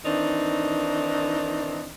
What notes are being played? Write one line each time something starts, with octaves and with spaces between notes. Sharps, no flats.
D#3 E3 C4 D4 D#4